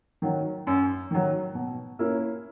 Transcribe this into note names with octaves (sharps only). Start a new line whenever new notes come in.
D#3 F#3
F#2
D#3 F#3
B2
A#3 C#4 E4